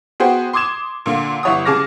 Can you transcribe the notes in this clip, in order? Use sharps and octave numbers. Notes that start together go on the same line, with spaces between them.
B3 F#4 G#4 C5 G5
C6 D6 D#6 G#6 E7
A#2 D3 A#3
G1 E4 C#5 F#5 D#6
C#3 G#4 A5 D6 F6 A#6